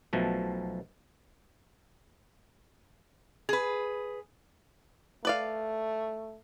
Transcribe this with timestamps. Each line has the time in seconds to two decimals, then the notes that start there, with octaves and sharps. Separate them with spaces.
0.13 B1 B2 F3 A3
3.49 G#4 B4
5.25 A3 B4 D5 F5